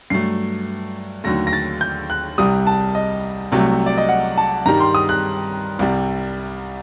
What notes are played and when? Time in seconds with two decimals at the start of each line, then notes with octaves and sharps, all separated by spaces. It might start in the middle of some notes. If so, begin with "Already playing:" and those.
0.10 G2 F#3 A3 C7
1.24 D#2 D3 F#3 A3 A#6
1.47 A#6
1.53 A6
1.81 G6
2.10 F#6
2.38 C2 C3 G3 D#6
2.67 A5
2.95 D#5
3.52 C2 C3 F#3 A3
3.86 D5
3.98 D#5
4.09 F#5
4.37 A5
4.66 G2 D#3 G3 A#5
4.80 C6
4.95 D#6
5.09 F#6
5.79 C2 C3 G3